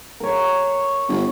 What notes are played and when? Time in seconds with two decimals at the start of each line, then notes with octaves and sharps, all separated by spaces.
0.20 A#4 C#5
1.08 G1